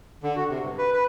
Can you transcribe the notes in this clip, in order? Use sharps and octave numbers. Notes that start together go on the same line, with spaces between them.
D3
F#4
C3
G2
B4
B4